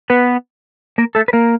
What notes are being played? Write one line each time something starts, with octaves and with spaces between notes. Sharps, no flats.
B3 B4
A#3 A#4
A3 A4
B4
A#3 A#4